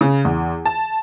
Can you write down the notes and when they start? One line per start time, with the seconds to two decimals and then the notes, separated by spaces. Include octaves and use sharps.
0.01 C#3
0.25 E2
0.66 A5